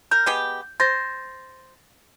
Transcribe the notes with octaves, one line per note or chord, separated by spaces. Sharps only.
A#4 G6
G#3 B3 G4
C5 A6 A#6